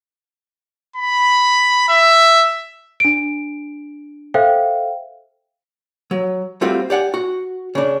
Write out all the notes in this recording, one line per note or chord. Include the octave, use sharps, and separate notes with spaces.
B5
E5
D4 D7
A4 C5 E5 F5 G5
F#3
G3 A3 C4 F4 F#4 C5
G4 D5 F#5 G#5
F#4
C#3 D4